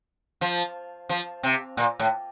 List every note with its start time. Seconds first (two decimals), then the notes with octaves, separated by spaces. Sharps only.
0.41 F3
1.09 F3
1.43 C3
1.77 A#2
1.99 A2